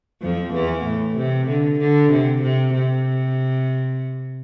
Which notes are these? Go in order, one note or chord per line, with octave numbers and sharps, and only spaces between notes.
F2 F3
E2 E3
A2
C3
D3
D3
C3
C3
C3